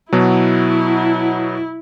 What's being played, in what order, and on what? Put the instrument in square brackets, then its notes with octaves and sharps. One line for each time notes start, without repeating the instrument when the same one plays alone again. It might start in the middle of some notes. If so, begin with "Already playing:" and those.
[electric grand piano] B2 F#3 [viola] E4